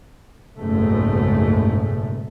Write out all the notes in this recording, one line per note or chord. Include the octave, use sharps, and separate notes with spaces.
F#1 B1 G#2 A3